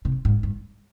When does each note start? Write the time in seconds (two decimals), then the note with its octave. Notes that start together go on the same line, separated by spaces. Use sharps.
0.05 C3
0.25 G#2
0.43 G2